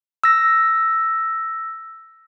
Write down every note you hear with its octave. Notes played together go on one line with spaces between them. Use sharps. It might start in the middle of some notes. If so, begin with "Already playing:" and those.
E6 A#6